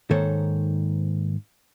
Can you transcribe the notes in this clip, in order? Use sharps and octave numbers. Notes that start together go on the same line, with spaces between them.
G#2 D#3 A#3 A4 C5 C#5